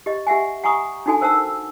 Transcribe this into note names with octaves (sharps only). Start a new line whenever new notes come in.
G4 D#5
G4 E5 F#5 G#5
F#5 G#5 A#5 C#6 D#6
D4 D#4 F#4 A4 G#5
A#4 C5 F#5 A5 E6